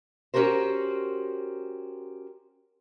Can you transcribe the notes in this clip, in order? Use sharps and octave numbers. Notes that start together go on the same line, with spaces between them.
C#4 F#4 G4 A#4 C5